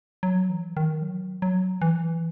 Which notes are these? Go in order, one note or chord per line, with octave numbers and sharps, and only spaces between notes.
F#3
E3
D#3
F#3
F#3
E3